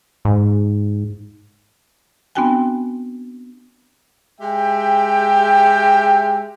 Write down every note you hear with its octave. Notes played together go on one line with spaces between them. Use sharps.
G#2
B3 C4 D4 F#4 G5 G#5
G#3 G4 E5 G5